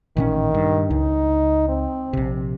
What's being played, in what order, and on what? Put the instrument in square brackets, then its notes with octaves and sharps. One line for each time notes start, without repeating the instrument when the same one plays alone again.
[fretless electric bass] A1 A#2 C#4 [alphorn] D#3
[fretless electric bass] G2
[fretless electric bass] C#2 [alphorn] D#4
[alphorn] C4
[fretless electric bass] A#1 C3